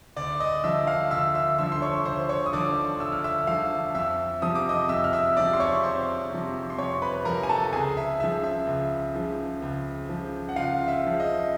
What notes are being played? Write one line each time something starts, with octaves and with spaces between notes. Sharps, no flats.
D2 D5 D6
D#5 D#6
D3 F3 E5 E6
F5 F6
D2 E5 E6
E5 E6
D3 F3 E5 E6
C6
C#5 C#6
D2 C5 C6
C#5 C#6
D#6
D3 F3 D5 D6
D2 E6
F6
E5 E6
D3 F3 F5 F6
F2 E5 E6
C3 F3 D#6
D6
D#5 D#6
F2 E5 E6
F6
E5 E6
C3 F3 D5 D6
C6
C#5 C#6
F2 C5 C6
C3 F3
C6
F2 C#5 C#6
B4 B5
C3 F3 A#4 A#5
G#5
A4 A5
C#2 G#4 G#5
E5
C#3 F3 E5
E5
C#2
C#3 F3
C#2
C#3 F3
F#5
C#2 F4 F5
E5
C#3 F3
D#5